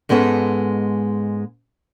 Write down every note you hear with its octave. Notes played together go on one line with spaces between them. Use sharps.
G#2 G#3 B3 C#4 A4